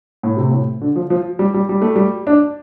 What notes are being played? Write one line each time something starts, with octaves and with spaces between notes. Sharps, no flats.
A2
C3
A2
D3
F3
F3
G3
G3
G3
A3
G3
D4